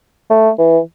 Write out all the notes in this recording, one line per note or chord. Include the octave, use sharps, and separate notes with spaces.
A3
E3